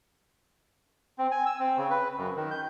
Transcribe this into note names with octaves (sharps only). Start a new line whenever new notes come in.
C4
G#5
E6
C4
C#3
B4
F#2
D#3
G6